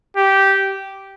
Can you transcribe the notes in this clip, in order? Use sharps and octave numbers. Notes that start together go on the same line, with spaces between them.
G4